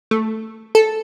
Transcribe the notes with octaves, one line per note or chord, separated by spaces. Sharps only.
A3
A4